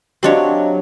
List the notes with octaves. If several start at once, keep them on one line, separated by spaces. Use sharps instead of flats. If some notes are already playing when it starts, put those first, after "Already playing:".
F#3 C4 D4 G4 C#5 D#5 F5